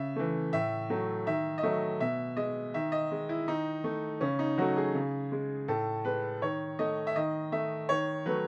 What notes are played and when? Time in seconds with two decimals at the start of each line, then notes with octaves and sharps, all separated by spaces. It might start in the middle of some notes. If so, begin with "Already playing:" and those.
Already playing: C#3 E5
0.16 E3 A3
0.53 A2 E5
0.90 F#3 A3
1.26 D#3 E5
1.58 D#5
1.63 F#3 A3 E5
2.00 B2 E5
2.37 G#3 D#5
2.74 D#3 E5
2.92 D#5
3.11 G#3
3.29 E4
3.48 D#3 D#4
3.84 A3
4.21 C#3 C#4
4.39 D#4
4.58 F#3 A3 F#4
4.77 G#4
4.95 C#3
5.32 G#3
5.68 A2 A4
6.05 G#3 B4
6.42 D#3 C#5
6.79 A3 D#5
7.07 E5
7.16 D#3 D#5
7.52 A3 E5
7.89 D#3 C#5
8.26 F#3 A3 B4